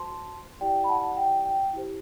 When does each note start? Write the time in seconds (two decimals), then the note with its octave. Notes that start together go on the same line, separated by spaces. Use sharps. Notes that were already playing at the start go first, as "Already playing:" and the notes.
Already playing: F#4 C5 A5 C6
0.61 E4 G4 D5 G5
0.84 B5
0.89 F#5 A5
1.17 G5
1.46 G5
1.73 E4 G4 C5